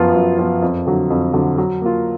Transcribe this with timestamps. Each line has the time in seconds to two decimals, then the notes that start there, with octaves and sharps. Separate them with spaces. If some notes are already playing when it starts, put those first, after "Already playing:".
Already playing: F#2 F3 B3 F4
0.14 F#2
0.38 F3 B3 F4
0.62 F2
0.87 D3 F#3
1.10 F2
1.33 D3 F#3
1.58 F#3
1.82 A#3 F4